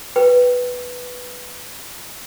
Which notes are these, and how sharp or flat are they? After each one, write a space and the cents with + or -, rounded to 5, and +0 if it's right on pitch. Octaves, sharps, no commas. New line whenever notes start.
B4 +0 G5 +0